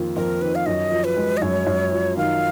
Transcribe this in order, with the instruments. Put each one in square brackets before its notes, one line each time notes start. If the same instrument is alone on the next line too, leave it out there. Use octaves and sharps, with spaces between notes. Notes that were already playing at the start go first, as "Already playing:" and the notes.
Already playing: [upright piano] F2 D#3 A#3 F4
[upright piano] F2 [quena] A#4
[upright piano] D#3 [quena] B4
[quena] F5
[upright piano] F#2 [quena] D#5
[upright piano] F3
[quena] B4
[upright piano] G#3
[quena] D#5
[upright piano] F#2 [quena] C#5
[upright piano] F#2
F3
[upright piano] D#3 [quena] F5